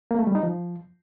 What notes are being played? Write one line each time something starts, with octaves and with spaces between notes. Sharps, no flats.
A#3
A3
G3
D#4
F3